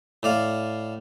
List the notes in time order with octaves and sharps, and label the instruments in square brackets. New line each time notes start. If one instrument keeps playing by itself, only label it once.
[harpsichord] A2 D5 F5